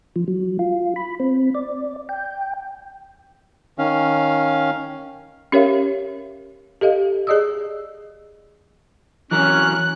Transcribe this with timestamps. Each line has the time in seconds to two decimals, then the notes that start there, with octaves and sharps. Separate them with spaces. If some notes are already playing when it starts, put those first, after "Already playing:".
0.16 F3
0.28 F#3
0.59 F4
0.96 B5
1.20 C4
1.55 D5
2.09 G5
3.78 D#3 C#4 F5
5.52 C#4 G4 A#4 C#5 E5 F5
6.81 G4 A4 D#5 F5
7.27 G#4 D5 D#5 D#6 E6
9.31 E3 F#3 C#4 A#4 F#6